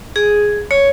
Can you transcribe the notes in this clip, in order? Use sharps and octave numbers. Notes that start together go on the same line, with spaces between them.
G#4
C#5